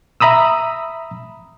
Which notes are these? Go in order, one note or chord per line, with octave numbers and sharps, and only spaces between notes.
E5 A#5 B5 D#6 E6